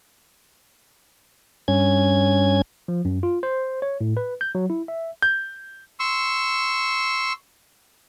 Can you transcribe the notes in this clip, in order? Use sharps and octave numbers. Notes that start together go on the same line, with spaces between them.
G2 C#4 G#6
F3
F#2
F4
C5
C#5
A2
B4
G6
F#3
E4
E5
G6
C6 C#6 E6